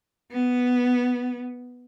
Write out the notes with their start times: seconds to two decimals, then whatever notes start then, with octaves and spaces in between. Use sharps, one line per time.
0.32 B3